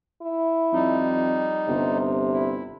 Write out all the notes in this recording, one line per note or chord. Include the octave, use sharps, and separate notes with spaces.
E4
F2 G3 D#4
G1 C3
E4